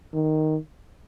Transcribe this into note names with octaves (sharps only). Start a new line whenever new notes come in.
D#3